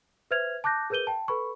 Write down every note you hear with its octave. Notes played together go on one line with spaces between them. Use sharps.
B4 C5 E5 F6 G#6 F7
A5 D6 F#6 G6 A#6
G#4 A#4 B4 G6 D#7 G7
G5 A5
A4 B4 B5 C#6